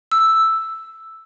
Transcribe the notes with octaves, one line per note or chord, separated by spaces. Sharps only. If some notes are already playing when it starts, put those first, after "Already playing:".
E6